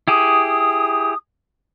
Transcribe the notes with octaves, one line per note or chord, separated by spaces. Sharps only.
E4 G4 G#4 D#6